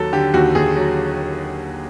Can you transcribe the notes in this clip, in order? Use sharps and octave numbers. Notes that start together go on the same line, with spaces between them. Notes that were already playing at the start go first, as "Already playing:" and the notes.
Already playing: D#2 F#3 A4
D3 G4
D#2 F#4
D#2 G#4
F#3